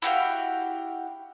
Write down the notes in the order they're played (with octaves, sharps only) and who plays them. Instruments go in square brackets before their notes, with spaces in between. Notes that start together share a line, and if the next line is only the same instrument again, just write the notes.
[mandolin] E4 F#4 G4 F5